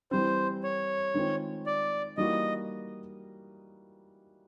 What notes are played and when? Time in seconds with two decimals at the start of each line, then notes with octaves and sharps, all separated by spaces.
0.11 E3 G3 C4 C5
0.63 C#5
1.14 D#3 G#3 C4 F4
1.66 D5
2.17 E3 G3 A#3 D#4 F#4 D#5